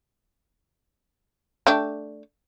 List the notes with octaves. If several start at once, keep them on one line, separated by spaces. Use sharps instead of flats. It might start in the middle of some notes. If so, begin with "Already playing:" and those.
A3 D4 G4